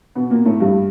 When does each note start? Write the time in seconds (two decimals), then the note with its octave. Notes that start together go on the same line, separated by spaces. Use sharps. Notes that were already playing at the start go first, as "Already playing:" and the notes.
0.15 B2 B3
0.30 A#2 A#3
0.45 A2 A3
0.60 G2 G3